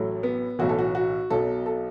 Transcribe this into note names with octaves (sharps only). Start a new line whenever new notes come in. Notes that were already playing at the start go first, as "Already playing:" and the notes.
Already playing: A1 A2 F#3 A3
B3
B1 A2 E3 F#4
A4
F#4
F#4
B1 B2 F#3 A4
A4